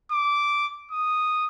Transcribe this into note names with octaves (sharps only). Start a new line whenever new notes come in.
D6
D#6